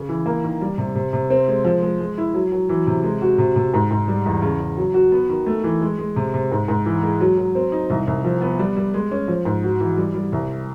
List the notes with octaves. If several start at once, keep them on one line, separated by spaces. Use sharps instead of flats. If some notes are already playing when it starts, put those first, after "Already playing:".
Already playing: C#3
E3
A#3
D#3
G3
C3
C3
C3
C4
G#3
F3
G#3
G#3
E4
F#3
F#3
E3
C3
G#3
F#4
C3
C3
G#2
G#2
G3
E2
C#3
C#3
F#3
F#4
B3
D#3
A3
E3
G#3
G#3
C3
C3
G#2
G#2
E3
G#3
F#3
F#3
C4
D#4
C2
C2
F3
B3
G3
G3
G#3
C#4
F3
G#2
F#4
E3
G3
G3
C2